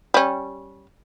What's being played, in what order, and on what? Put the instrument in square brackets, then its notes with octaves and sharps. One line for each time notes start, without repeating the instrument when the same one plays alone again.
[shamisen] G3 C#4